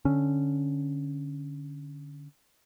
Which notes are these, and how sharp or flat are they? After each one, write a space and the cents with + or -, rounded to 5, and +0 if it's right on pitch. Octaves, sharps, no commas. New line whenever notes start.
D3 +0 C#4 +0